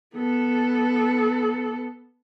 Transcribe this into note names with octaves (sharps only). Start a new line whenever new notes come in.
B3 A4